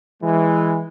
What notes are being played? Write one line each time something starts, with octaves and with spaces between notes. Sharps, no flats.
E3 G#3